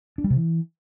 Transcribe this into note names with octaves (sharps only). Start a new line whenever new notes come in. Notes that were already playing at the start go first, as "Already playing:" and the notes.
D4
G3
C3
E3